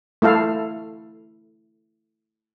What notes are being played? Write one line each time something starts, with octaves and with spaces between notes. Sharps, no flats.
A3 E4 A4 F5